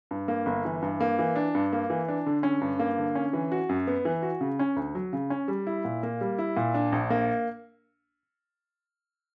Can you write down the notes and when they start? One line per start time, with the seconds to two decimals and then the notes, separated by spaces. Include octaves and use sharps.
0.11 G2
0.28 A#3
0.46 G1
0.65 E3
0.82 G2
1.00 A#3
1.19 E3
1.36 D4
1.55 G2
1.73 A#3
1.90 E3
2.08 D4
2.26 D3
2.43 C#4
2.61 G2
2.79 A#3
2.98 D3
3.15 C#4
3.33 E3
3.52 F#4
3.69 F#2
3.87 B3
4.05 E3
4.22 F#4
4.41 C#3
4.59 C#4
4.76 D2
4.95 F#3
5.13 C#3
5.30 C#4
5.48 G3
5.67 E4
5.85 A#2
6.03 A#3
6.21 G3
6.39 E4
6.57 A#2
6.74 D4
6.92 A#1
7.10 A#3